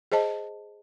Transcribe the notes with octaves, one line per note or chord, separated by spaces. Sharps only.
G#4 C5 D#5 A5